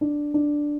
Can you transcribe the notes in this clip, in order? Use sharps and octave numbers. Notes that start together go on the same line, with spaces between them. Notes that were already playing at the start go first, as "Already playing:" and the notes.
D4
D4